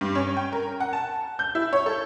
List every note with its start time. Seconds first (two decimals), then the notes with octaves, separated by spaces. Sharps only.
0.01 G2
0.15 C#4
0.37 G5
0.53 A#4
0.80 F#5
0.93 A5
1.39 G6
1.55 E4
1.73 C#5
1.86 A4